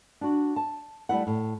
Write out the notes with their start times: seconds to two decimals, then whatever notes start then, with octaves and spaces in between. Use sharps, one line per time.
0.21 D4 F#4
0.56 A5
1.09 G3 A3 E4 F#5
1.27 A2